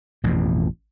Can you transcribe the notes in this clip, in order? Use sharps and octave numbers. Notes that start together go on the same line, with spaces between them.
A1 F2 B2